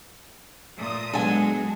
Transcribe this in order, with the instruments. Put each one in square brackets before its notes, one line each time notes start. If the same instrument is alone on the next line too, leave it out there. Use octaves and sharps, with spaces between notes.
[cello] A#2 A3 [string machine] D#6
[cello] F#3 [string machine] G#3 [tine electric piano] B3 D4 [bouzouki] A4 G#5